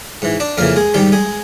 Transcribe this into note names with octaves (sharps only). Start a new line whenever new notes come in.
G#2 E3
D4 D5
F2 C#3 E3 A#3 A#4
G#3 G#4
G#2 D#3 G3 G4
G#3 G#4